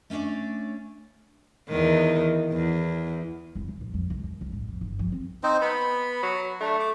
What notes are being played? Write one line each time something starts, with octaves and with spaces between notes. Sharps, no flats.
A3 C#4 D4 C#5 D5
E2 D#3
E2
F1
C#2
A#1
F2
C#2
D#2
C#2
A2
F2
G1
F3
C4
C4 D#4 C5
B3 B5
F#3
A3 D4
D6